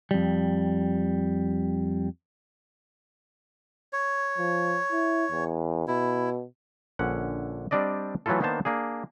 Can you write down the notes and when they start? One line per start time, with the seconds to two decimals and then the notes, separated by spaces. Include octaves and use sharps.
0.11 F2 G3
3.93 C#5
4.38 F3
4.92 E4
5.31 E2
5.88 B2 E4
6.99 A#1 D3 C#4 F#5
7.71 G3 C4 D4 D5 D#5
8.26 E3 F#3 A3 E4 F4 A4
8.40 D#3 A#3 B3 D4 C5 A5
8.65 A#3 D4 G#4